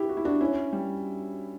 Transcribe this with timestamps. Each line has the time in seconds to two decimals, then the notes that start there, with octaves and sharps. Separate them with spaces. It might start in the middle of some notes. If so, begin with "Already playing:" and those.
Already playing: E4 G4
0.09 F#4
0.17 E4
0.25 D4 F#4
0.41 C#4 E4
0.73 G3